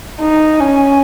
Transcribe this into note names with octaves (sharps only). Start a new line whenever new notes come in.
D#4
C#4